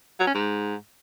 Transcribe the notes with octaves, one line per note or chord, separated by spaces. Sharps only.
F#3
C#4
G#2